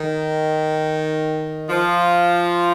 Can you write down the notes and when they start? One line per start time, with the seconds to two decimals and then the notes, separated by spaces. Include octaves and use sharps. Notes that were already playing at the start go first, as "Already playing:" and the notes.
Already playing: D#3
1.69 F3